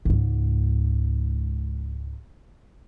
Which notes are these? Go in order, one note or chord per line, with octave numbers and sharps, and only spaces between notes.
C#2 G#2